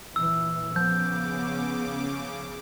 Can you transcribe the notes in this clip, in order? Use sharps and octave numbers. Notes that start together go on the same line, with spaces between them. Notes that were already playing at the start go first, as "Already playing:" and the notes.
A#1 E3 E6
C#3 F3 B3 D6 G6